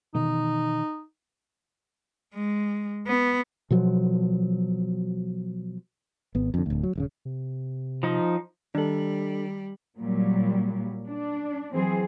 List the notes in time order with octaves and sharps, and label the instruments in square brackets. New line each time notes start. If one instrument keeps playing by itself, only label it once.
[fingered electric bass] B2 D#3 E3 [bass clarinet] D#4
[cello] G#3
B3
[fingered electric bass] B2 F3 F#3
[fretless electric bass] G#1 B3
F2 D3
D1 D2
F#3
D#1 G#2 C#3
[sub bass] C3
[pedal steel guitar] F3 D#4
[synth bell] D#3 F#7 [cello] G3 [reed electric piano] D4 A4
[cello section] A#2 F#3 G3
D4
E3 F#3 C4 G#4 C5